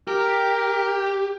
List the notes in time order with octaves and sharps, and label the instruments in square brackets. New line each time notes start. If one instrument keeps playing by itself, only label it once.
[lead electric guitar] G4 [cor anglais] A#4